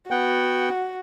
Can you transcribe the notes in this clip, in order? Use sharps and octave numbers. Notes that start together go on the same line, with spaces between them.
B3 F#4 F#5 G5